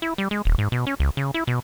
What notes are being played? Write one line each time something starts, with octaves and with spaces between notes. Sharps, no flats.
E4
G3
G#3
D#1
G#2
B2
C#4
C#2
C#3
E4
B2